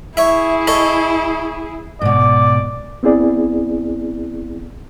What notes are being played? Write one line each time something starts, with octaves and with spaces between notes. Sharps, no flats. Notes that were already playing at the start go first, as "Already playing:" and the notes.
E4 G#4 C#5 E5
A4 C#5 D#5
G#2 B2 D5
B3 C4 E4 G#4 D5